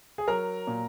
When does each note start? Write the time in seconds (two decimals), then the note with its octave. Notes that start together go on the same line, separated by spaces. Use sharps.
0.18 G#4
0.28 F#3 A#4
0.67 A#2